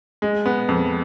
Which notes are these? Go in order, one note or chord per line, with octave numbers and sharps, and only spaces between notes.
G#3
B3
F2